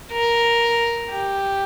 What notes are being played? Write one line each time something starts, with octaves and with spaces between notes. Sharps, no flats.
A#4
G4